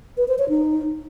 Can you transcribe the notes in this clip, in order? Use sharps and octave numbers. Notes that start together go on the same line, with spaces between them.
B4
C5
C#5
D#4